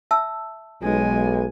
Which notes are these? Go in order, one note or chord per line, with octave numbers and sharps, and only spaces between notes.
E5 A5 E6
B1 G#3 G#5